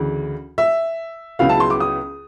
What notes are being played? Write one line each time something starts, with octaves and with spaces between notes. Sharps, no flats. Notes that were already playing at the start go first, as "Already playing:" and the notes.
Already playing: D2 C#3 E3
E5
C#2 C#3 F#3 B3 E4 F5
A5
C6
D6
D#6